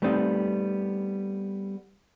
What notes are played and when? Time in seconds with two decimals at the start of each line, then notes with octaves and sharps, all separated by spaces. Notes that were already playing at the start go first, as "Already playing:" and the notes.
0.02 G3 A3 B3 C4 D#4